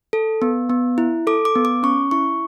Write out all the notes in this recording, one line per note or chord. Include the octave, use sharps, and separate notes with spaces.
A4
B3
B3
E4
A4 D6
D6
B3
D6
C#4 C#6
E4 C#6